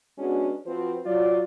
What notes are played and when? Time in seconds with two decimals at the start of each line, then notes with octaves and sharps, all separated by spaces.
0.18 G#3 B3 C#4 D4 F#4
0.66 F3 C4 F4 F#4 B4 C5
1.05 F#3 F4 D5